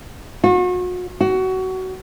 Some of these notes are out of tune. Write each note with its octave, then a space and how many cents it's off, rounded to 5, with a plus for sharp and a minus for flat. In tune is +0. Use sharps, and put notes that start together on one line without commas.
F#4 -40
F#4 +20